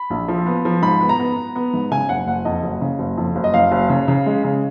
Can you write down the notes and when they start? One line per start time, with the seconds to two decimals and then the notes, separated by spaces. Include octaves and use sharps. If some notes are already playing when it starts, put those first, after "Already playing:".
Already playing: B5
0.10 A#1
0.28 F3
0.46 B3
0.65 F3
0.83 G#2 B5
1.01 B3
1.09 A#5
1.19 B3
1.37 B3
1.56 B3
1.74 G#2
1.91 C#3 G#5
2.09 F#1 F#5
2.27 F#1 F#5
2.45 F2 D#5
2.63 F#1
2.81 C#3
2.99 F#1
3.17 F2
3.35 F#1
3.44 D#5
3.54 F#1 F5
3.71 F#1
3.89 C#3
4.08 C#3
4.26 G#3
4.44 C#3